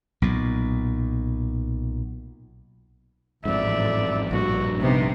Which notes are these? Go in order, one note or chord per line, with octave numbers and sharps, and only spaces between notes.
B1 A#2
A1 F2 G#2 D5 E5
A#1 G2 F#4
C3 B3 D#4